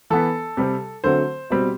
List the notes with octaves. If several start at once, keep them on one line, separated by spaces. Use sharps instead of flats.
E3 B3 A4
C3 G3 C4
D3 F#3 A3 C4 C5
B2 G3 C4